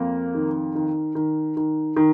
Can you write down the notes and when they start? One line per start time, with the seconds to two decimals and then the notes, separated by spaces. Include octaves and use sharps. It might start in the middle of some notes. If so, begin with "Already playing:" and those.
Already playing: F2 A#3
0.35 D#3
0.75 D#3
1.15 D#3
1.57 D#3
1.96 D#3